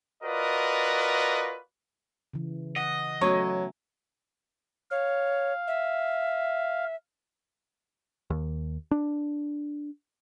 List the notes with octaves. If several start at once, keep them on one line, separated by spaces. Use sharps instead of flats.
F4 F#4 A#4 B4 D5 D#5
C#3 E3
D#5 F#5
F#3 A3 B3 C#4 C#5
C#5 F5
E5
D#2
D4